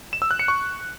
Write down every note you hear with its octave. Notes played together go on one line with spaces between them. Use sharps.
E7
E6
F#6
C#7
C#6